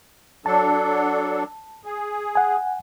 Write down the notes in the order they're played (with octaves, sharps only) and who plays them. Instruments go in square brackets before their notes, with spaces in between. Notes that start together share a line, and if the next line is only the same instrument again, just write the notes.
[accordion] F#3 D4 A4 [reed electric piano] A5
[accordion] G#4
[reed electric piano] F#5 G#5